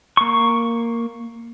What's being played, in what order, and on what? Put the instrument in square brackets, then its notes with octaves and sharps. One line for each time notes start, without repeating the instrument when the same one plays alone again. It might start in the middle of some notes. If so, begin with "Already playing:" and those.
[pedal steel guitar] A#3 C#6